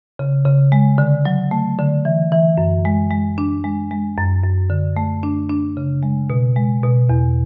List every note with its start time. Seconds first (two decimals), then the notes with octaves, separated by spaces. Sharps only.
0.19 C#3
0.46 C#3
0.72 G#3
0.98 D3
1.25 F#3
1.51 A3
1.79 D3
2.05 E3
2.32 E3
2.58 F#2
2.85 G#3
3.11 G#3
3.38 D4
3.64 G#3
3.91 G#3
4.17 F#2
4.43 F#2
4.70 D3
4.97 A3
5.23 D4
5.49 D4
5.77 C#3
6.03 G#3
6.30 B2
6.56 G#3
6.83 B2
7.10 E2